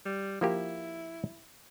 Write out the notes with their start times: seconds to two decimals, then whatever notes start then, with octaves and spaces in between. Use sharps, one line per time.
0.06 G3
0.41 F3 A#3 E4 G4